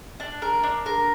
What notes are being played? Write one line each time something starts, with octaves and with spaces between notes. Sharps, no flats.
D4
A#4
D4
A#4